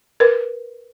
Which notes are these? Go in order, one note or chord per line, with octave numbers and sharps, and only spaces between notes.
A#4 B4